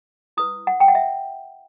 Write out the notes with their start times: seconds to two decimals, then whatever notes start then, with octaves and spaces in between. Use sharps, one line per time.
0.37 E4 B4 D#6
0.67 F#5
0.80 G5
0.88 F#5
0.95 E5